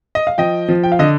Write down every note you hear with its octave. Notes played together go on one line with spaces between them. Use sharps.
D#5
F5
F3 D#5 G5
F3
G5
F5
D3 D#5